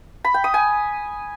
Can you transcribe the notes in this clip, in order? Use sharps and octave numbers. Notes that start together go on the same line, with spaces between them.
B5
G5
D#6
G#5